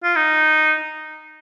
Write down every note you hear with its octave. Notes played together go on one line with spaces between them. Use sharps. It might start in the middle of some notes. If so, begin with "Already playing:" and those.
F4
D#4